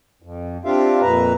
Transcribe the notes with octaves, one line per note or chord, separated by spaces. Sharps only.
F2
C4 D4 F4 G4 E5 F5
F2 A#2 B4 E5 A#5